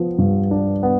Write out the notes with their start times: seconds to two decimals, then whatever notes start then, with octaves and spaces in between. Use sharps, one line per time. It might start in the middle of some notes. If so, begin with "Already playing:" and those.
Already playing: F3 B3
0.18 G2
0.51 D4
0.83 B3